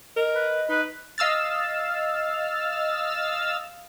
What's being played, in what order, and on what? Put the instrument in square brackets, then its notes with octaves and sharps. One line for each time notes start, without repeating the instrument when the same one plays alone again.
[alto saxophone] A#4 [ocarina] D#5
[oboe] B4
[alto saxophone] D#4 [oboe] B4
[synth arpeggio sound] D#5 F5 E6 F6 A6